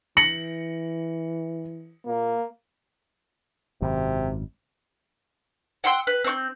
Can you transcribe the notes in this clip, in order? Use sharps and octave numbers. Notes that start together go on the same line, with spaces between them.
E3 A#6 C#7 F#7
A#2 A#3
G#1 F#2 C3
F#5 G5 C6 E6
B4
C4 C#6 G6